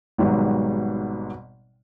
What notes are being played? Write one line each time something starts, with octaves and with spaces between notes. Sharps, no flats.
G#1 G#2 B2 F#3 G3